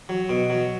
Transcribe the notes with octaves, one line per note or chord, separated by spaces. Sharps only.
F#3
B2
F#3